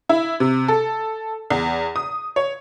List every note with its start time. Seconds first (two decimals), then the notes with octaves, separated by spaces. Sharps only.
0.09 E4
0.40 C3
0.68 A4
1.50 E2
1.96 D#6
2.36 C#5